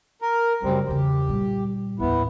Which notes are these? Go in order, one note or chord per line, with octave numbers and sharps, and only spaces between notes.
A#4
F#2 C#3 G3 A3 C4
E2 C#3 G4
A#2 G3
A1 D#2 B3 E4